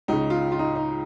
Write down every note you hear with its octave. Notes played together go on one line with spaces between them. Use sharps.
C#2 C#3 D#4
F4
F4
D#4
D#4